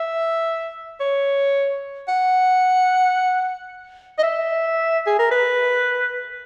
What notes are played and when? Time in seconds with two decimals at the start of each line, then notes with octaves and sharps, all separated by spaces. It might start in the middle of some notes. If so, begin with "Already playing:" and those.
Already playing: E5
1.00 C#5
2.08 F#5
4.18 D#5
4.23 E5
5.06 G#4
5.19 A#4
5.31 B4